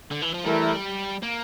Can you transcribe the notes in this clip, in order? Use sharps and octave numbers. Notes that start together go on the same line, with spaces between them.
D3
E3
F3
E3 G3 A3 E4 A#4
A#3